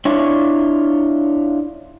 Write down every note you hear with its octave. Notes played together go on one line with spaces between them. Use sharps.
D4 E4 F4 C#5